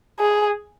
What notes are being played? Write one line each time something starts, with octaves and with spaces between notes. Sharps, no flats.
G#4